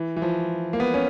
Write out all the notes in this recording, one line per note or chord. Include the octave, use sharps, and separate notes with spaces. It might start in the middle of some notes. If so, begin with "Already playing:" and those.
Already playing: E3
E3
F3
A#3
B3
C#4